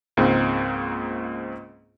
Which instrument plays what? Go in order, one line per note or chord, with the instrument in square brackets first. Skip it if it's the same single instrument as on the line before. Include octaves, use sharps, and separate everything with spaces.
[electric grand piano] C#2 G#2 A#3 C4